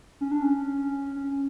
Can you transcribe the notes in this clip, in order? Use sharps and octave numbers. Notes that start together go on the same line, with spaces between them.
C#4
D4
C#4
C#4